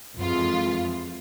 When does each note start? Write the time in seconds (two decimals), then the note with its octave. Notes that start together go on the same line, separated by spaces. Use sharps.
0.16 F2 E3 G#3 F4